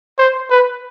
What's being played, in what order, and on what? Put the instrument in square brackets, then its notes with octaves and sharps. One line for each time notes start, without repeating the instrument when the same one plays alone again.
[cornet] C5
B4